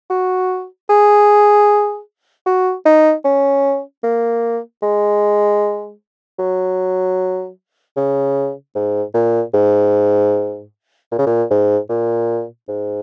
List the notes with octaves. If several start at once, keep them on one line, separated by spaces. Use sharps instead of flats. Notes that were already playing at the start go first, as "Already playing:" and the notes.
F#4
G#4
F#4
D#4
C#4
A#3
G#3
F#3
C#3
G#2
A#2
G#2
A#2
C#3
A#2
G#2
A#2
G#2